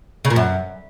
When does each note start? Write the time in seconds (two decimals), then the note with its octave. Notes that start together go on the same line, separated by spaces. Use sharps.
0.25 C#3
0.30 A#2
0.36 F#2